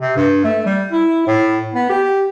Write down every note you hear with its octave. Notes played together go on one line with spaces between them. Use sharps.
C3
G2
A3
G3
E4
A2
B3
G4